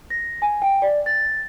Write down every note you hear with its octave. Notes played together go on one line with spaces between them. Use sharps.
A#6
G#5
G5
D5
A6